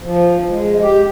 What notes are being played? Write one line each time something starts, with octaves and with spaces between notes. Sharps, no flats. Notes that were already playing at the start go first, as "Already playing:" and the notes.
F3
G#3
G4